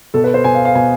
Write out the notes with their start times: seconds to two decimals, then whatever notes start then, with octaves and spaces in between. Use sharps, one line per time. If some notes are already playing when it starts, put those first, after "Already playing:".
0.14 B2 A4
0.24 B4
0.34 C5
0.44 B2 G#5
0.55 F5
0.65 F5
0.75 B2 G#5